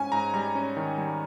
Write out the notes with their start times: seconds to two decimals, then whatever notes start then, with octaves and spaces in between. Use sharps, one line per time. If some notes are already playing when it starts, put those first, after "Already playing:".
Already playing: G#2 C#4 G#5
0.12 G#2 A#5
0.34 G3 A#5
0.55 C#4
0.77 D#3
0.98 G3